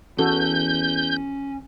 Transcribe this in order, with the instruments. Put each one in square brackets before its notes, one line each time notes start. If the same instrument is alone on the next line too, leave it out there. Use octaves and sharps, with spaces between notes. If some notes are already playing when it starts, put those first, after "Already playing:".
[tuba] E2 [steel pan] E3 F#4 A4 [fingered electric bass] C#4 [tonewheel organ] G6